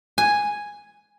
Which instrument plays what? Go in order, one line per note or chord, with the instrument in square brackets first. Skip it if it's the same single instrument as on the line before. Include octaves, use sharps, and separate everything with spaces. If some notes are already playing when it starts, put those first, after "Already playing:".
[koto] G#5